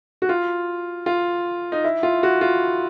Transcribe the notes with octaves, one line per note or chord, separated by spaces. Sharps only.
F#4
F4
F4
D#4
E4
F4
F#4
F4